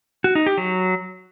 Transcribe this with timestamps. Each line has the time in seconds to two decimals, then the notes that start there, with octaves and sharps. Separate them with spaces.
0.24 F#4
0.35 D#4
0.46 G4
0.58 F#3